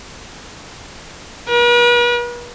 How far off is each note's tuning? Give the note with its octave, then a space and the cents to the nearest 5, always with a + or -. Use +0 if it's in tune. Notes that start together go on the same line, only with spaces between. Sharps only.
B4 -45